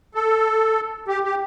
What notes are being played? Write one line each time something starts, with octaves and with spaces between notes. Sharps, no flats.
A4
G4
G4